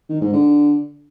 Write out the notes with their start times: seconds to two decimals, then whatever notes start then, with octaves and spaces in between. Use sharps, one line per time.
0.09 D#3
0.21 G#2
0.33 D3